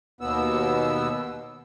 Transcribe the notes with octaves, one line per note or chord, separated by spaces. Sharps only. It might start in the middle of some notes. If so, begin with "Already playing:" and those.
D#2 B2 B3 E6